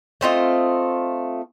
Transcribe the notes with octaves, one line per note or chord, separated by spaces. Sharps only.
A3 C4 F4 D#5